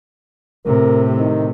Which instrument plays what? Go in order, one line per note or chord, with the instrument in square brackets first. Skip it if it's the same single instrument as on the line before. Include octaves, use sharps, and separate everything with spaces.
[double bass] A2 C3 [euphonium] A#4
[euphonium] D#3